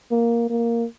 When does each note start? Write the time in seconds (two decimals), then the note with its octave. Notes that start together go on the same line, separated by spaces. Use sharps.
0.11 A#3
0.50 A#3